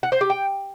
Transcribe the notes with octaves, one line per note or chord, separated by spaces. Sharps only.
F#5
C5
G4
G5